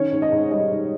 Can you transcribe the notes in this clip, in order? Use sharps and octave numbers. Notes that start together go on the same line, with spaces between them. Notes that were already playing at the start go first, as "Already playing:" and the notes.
Already playing: D#3 C#4 C#5
G#2
D#5
G#2
G3 D#5
G#2